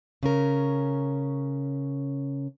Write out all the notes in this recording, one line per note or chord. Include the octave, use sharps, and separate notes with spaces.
C#3 C#4 A#4